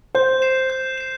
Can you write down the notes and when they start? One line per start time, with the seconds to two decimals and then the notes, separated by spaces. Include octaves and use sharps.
0.15 C5 G6
0.42 C7 E7
0.70 G6
0.98 C7 E7